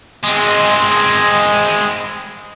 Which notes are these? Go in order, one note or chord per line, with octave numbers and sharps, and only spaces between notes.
G#3 C4